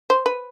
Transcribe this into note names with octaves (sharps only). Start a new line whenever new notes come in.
C5
B4